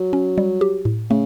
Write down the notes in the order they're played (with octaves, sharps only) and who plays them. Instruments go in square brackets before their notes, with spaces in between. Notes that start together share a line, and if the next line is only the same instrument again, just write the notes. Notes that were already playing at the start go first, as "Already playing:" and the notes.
Already playing: [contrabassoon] F#3
[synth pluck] C#4
G3
G4
A2
[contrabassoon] C#3 [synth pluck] A3